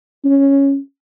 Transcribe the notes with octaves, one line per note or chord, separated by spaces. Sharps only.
C#4